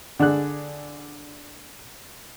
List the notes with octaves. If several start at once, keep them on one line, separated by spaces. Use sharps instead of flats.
D3 D4 G#4 F#6